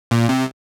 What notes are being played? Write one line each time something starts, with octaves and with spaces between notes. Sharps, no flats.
A#2
C3